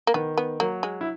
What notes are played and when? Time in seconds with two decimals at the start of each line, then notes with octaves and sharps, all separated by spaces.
0.07 A#3
0.14 D#3 B3
0.37 B3
0.60 F#3 A#3
0.83 G#3
1.01 E4